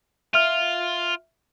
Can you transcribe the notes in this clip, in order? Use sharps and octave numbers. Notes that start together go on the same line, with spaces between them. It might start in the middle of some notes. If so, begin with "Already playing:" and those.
F4 E5 F6